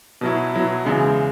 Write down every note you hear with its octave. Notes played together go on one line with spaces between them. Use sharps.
B2 F#3 E4
B2 F#3 E4
E2 C#3 G#3 E4